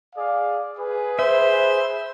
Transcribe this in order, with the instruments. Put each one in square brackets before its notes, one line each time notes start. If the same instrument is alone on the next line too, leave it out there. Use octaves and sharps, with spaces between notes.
[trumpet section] G#4 D5 F5
G#4 B4
[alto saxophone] C5 [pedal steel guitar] E5